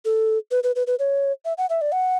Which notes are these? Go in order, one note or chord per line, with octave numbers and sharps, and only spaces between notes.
A4
B4
B4
B4
B4
C#5
E5
F#5
E5
D5
F#5